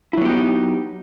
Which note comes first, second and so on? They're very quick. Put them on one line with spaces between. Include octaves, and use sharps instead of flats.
E4 F#3 B3 G4 D#4